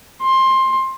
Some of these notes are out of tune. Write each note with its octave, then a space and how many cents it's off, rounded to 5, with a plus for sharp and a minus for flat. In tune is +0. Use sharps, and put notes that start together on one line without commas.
C6 +15